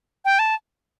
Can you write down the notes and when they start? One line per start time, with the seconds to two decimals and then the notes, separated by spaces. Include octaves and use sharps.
0.25 G5
0.39 A5